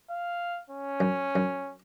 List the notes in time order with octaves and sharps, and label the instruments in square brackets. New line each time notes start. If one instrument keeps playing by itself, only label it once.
[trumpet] F5
C#4
[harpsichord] F#2
F#2